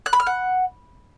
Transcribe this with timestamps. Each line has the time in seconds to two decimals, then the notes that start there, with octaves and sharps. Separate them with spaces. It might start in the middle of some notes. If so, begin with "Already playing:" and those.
0.06 F#6
0.13 B5
0.20 F6
0.27 F#5